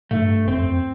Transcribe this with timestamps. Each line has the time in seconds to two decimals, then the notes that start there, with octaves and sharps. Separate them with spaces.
0.11 G2 A3
0.48 F2 C4